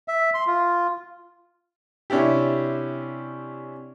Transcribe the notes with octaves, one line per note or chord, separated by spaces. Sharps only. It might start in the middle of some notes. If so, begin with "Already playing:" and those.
E5
C6
F4
C3 C#4 D4 E4 G4